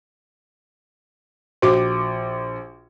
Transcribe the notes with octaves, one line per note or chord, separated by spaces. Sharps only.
A#1 F#4 D6